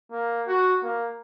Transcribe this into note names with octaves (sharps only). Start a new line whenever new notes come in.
A#3
F#4
A#3